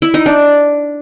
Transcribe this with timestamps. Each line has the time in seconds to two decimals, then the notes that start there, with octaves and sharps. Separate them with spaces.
0.02 E4
0.14 D#4
0.26 D4